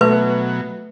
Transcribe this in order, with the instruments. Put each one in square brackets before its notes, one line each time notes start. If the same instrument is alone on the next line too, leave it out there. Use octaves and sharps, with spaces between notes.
[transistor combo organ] B2 F#3 [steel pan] A3 [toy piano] B4